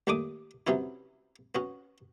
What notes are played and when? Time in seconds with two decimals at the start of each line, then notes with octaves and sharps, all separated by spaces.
0.07 D#2 A2 A3 D4 D6 D#6
0.67 C3 F#3 B3 C#4 E4
1.55 B3 C#4 F#4